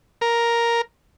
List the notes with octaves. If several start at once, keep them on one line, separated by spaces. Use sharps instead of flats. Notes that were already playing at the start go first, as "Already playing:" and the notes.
A#4